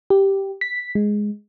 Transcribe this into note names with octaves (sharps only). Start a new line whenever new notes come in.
G4
B6
G#3